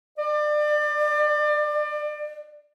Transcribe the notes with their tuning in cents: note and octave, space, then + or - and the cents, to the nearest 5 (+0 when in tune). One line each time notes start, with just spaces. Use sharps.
D5 +30